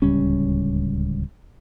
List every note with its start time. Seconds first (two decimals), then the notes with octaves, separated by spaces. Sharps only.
0.02 D1 C#2 G3 C#4